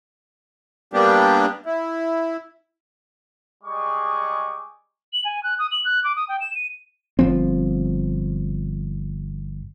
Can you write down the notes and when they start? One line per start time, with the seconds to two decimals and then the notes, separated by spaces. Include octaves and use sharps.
0.93 G3 A#3 B3 D4 G4
1.66 E4
3.64 G3 G#3 G#4 D#5 C#6 D6
5.13 F#7
5.24 G#5
5.43 F#6
5.59 D#6
5.71 F#7
5.84 F#6
6.04 D6
6.16 D#6
6.28 G5
6.40 E7
6.55 D#7
7.19 G1 F3 C4